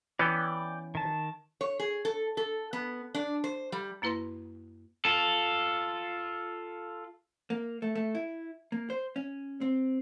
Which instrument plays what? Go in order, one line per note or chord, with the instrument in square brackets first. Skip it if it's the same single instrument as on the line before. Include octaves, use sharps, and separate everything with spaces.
[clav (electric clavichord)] E3 B3 C#4 [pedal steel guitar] D5 G5
[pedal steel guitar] D#3 A5
[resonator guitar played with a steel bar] C#5
G#4
A4
A4
B3
D4
C5
G3
[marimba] F#2 A#3 E4 B4 C6 A#6
[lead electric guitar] F4 A4
[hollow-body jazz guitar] A#3
A3
A3
E4
A#3
C5
C#4
C4